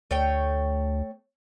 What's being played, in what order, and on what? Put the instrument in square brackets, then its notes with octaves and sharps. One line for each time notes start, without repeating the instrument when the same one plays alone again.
[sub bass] D2 [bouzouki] A3 C#5 G5